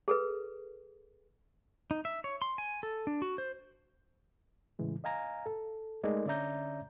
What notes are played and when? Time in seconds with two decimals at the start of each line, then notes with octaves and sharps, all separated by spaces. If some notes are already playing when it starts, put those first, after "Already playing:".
0.08 G#4 A4 B4
1.91 D#4
2.05 E5
2.24 C#5
2.42 C6
2.58 G#5
2.83 A4
3.07 D4
3.22 F#4
3.38 C5
4.79 A2 C#3 E3 G#3
5.04 D#5 F5 G#5 A#5
5.46 A4
6.03 G#3 A3 D#4 A#4 D5 D#5
6.26 D3 C#4 D5 E5 A#5 G6